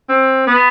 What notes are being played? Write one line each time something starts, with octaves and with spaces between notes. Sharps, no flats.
C4
B3